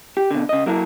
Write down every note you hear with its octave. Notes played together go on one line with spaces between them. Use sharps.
G4
B2 D3
C#3 D#5
F#3 A#3 E4 A4 A#4